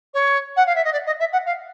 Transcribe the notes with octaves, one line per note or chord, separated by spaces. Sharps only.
C#5
F#5
F5
E5
D#5
D5
D#5
E5
F#5
F5